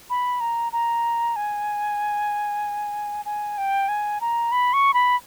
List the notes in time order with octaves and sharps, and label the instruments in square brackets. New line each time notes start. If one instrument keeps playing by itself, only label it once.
[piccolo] B5
A#5
A#5
G#5
G#5
G5
G#5
A#5
B5
C#6
B5